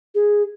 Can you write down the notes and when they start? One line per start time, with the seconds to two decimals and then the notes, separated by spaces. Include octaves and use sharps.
0.15 G#4